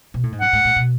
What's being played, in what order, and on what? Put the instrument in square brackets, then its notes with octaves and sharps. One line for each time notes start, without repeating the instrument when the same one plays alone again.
[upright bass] B2
A2
G#2
[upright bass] F#2 [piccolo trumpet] F#5
[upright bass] G#2
A2
B2